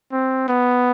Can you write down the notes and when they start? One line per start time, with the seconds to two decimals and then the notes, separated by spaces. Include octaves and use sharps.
0.12 C4
0.48 B3